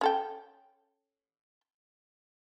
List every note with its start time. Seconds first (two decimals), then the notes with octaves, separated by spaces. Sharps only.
0.01 C#4 A4 G5